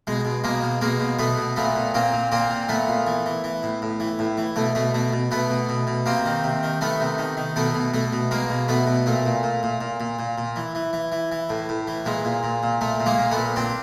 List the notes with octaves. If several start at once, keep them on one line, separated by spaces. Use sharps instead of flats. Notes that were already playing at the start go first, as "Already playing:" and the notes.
B2 G#3
B2
B2 G#3 A#3
B2
B2 G#3 A#3
B2
B2 A3 B3
B2
A#2 A3 B3
A#2
A#2 A#3 C4
A#2
A#2 A#3 C4
A#2
A#2 A3 B3
A#2
E3
E3
E3
A2
A2
E3
A2
E3
B2 A3
B2 A3
B2 A3
B2
B2 A3 B3
B2
B2
B2
C3 A#3 C4
D#3
C3
D#3
D#3 A3 B3
C3
D#3
D#3
B2 A3 B3
B2
B2 A3
B2
B2 G#3 A#3
B2
B2 A3 B3
B2
A#2 A3
A#2
A#2
A#2
A#2
A#2
A#2
A#2
E3
E3
E3
E3
E3
A2
A2
E3
A#2 G#3
A#2
A#2
A#2
A#2 A3
A#2
G#3 A#3
A#2
A3 B3
A#2
A#2 C4 D4